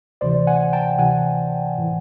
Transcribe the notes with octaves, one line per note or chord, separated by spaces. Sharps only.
D2 C3 E3 C5 D5
F#5 G#5
G5 A5
D2 C3 E3 F#5 G#5
A2 E3